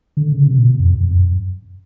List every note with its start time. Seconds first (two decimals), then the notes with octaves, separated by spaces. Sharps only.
0.17 D3
0.32 C#3
0.48 C3
0.58 A#2
0.64 B2
0.80 F2
0.95 F2
1.11 F#2